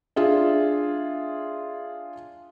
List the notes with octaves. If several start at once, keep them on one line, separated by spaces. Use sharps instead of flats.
D4 F4 G#4 E5